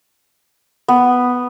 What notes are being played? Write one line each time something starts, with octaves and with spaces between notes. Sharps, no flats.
B3